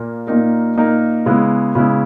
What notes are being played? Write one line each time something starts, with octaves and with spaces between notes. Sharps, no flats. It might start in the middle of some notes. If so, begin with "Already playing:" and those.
Already playing: A#2 A#3
A#2 A#3 D#4 A#4
A#2 A#3 D#4 A#4
C#3 G#3 B3 E4
C#3 G#3 B3 E4